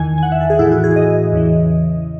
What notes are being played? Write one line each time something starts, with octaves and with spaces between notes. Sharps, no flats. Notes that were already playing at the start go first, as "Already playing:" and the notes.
Already playing: E2 D#3 G#5
G#5
F#5
E5
A4
G#4
A2 E3 E4
F#4
G#4
D#5
E2 C#3 E3